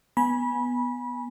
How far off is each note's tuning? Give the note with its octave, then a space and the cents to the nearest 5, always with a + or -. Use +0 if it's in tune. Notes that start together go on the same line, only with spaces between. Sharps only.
B3 +0 G#5 +0 B5 -25